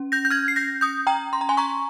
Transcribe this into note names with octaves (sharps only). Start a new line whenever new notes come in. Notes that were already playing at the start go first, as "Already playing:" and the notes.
Already playing: C#4
G6 A#6
G6
F6 G#6
C7
G6 A#6
D#6 G6
G5 A#5
C6
A#5
G#5 C6
A#5 C#6